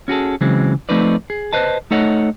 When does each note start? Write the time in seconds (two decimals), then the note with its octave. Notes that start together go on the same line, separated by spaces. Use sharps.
0.08 C#4 F#4 G#4 A4
0.41 C#3 E3 F#3 G#3 C4
0.89 F3 A3 C4 D#4 B4 D5
1.30 G#4
1.53 B4 C5 D#5 A5
1.91 A3 D#4 A4 C#5 D#5 F#5